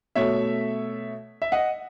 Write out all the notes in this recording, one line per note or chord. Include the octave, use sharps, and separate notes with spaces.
B2 A3 C#5 E5
E5
D#5 F#5